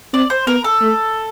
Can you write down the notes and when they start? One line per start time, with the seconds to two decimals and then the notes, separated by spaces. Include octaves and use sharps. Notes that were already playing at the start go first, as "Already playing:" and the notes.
0.13 C4 D5
0.30 C5
0.47 B3 A#4
0.64 A4
0.81 A3